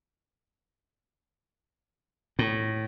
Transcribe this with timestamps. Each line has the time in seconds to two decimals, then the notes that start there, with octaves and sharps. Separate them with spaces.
2.39 A2